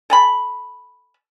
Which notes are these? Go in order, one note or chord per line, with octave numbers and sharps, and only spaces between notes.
A4 G#5 B5